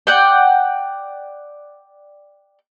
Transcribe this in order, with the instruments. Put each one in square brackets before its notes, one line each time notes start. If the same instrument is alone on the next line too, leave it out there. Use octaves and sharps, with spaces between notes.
[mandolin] D5 F#5 G5